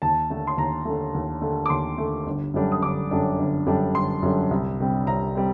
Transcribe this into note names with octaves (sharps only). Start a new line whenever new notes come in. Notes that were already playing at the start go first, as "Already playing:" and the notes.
D#2 A5
D3 A3
C6
D#2 A#5
D3 A3
D#2
D3 A3
D6
D#2 C6
D3 A3
G1
F#2 D3 G3 D4
D#6
G1 D6
F#2 D3 G3 D4
G1
F#2 D3 G3 D4
G1 C6
F#2 D3 G3 D4
C2
C3 G3 C4
C2 A#5
G3 C4